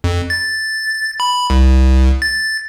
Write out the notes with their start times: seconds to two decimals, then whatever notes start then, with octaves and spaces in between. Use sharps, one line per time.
0.04 F2
0.30 A6
1.20 B5
1.50 C2
2.22 A6